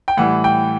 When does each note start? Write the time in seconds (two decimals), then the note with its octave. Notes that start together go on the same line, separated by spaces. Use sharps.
0.08 G5
0.17 A2 E3 G3 F#5
0.44 G5